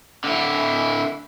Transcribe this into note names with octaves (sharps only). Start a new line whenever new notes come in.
D3 E4